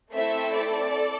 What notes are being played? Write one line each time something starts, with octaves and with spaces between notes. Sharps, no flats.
A3 C4 E4 A4 E5
D5
A4